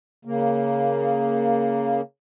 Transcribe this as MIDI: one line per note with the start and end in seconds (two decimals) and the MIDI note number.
0.25 2.01 49
0.25 2.01 58